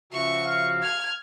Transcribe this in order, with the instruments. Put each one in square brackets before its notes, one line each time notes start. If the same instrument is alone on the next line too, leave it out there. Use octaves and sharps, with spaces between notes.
[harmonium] C#3 F3 F#4 [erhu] E5 [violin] C#6
[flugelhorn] F5
[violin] F6 [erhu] G#6